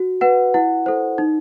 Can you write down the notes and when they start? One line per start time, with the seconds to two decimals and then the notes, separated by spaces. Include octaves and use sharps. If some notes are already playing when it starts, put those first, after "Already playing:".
Already playing: F#4
0.21 B4 F#5
0.54 E4 F#5
0.86 A4 C5
1.18 D#4